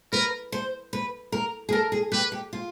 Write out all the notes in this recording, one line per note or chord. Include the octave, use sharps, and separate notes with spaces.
A#4 B4
C5
B4
A#4
G#4
A4 A#4
G#4
G4 B4
G4
F4